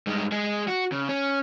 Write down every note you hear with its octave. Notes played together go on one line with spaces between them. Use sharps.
G2 G#3
G#3 G#4
F#4
C#3
C#4